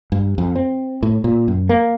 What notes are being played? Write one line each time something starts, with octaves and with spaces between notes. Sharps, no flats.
G2
F2
C4
A2
A#2
F#2
A#3